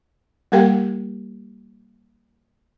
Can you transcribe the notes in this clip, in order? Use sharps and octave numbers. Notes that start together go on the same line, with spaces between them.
G3 A#3 G4 A#4 F5 G5